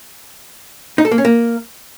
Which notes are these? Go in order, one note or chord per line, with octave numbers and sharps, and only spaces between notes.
D#4
A4
A#3
C#4
A#3